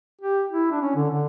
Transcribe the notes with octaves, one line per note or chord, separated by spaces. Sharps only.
G4
E4
D4
C#4
D3
D3